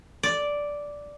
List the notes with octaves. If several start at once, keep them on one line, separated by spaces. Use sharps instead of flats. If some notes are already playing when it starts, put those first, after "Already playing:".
D5